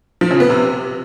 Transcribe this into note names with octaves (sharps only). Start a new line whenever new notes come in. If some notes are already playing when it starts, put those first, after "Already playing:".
F3
C#3
B3
C3